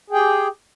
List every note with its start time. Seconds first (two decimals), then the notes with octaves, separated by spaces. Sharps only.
0.10 G#4
0.13 G5
0.15 G4